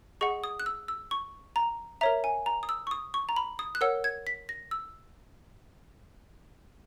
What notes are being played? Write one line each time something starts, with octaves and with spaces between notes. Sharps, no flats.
G#4 D#5 F#5 C#6
D#6
F#6
E6
E6
C#6
A#5
A#4 C#5 E5 A#5
G#5
A#5
D#6
E6
C#6
D#6
C#6
A#5
B5
D#6
F#6
A#4 C#5 F#5 E6
G#6
B6
A#6
E6